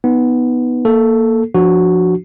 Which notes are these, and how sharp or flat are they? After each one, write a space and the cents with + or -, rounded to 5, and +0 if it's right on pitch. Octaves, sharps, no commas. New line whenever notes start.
B3 +0 D#4 +5
A#3 +0 A4 +0
F3 +0 D4 +10 F#4 +0